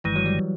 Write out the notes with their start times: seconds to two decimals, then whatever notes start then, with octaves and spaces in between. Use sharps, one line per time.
0.04 G1 G2 D#3 E3 G#3
0.16 F#3
0.26 G3